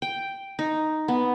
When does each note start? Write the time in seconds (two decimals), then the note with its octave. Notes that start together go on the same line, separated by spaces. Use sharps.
0.02 G5
0.59 D#4
1.08 B3